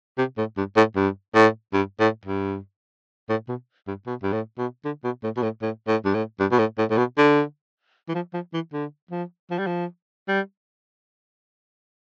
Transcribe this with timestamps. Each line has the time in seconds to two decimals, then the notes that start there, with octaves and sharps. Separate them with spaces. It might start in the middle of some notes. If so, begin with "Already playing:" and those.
0.18 C3
0.37 A2
0.57 G2
0.76 A2
0.96 G2
1.34 A2
1.73 G2
2.00 A2
2.25 G2
3.29 A2
3.48 B2
3.87 G2
4.06 B2
4.23 G2
4.32 A2
4.58 B2
4.85 D3
5.04 B2
5.23 A2
5.37 B2
5.42 A2
5.62 A2
5.88 A2
6.05 G2
6.14 A2
6.40 G2
6.51 B2
6.58 A2
6.78 A2
6.90 A2
6.97 B2
7.18 D3
8.09 E3
8.14 F3
8.34 F3
8.53 E3
8.72 D3
9.11 F3
9.50 F3
9.58 G3
9.66 F3
10.28 G3